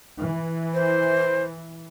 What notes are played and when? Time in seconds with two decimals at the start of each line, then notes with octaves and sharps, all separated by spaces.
0.21 E3
0.74 C5